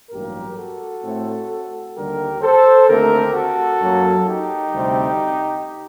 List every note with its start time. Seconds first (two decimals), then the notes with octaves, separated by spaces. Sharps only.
0.10 A1 G2 F#3 A#3 G4 A#4
0.57 F#4 A4
1.03 A2 A3 C4
1.95 D#2 D3 G3 G4 A#4
2.42 A4 C5
2.88 D#2 D3 A3 C4 G4 A#4
3.34 F#4 A4
3.80 F#2 F#3 A#3
4.27 D#4 G4
4.73 D2 C3 G3 C4